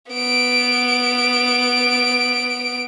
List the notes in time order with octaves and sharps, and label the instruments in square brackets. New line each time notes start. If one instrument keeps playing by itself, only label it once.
[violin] B3 D7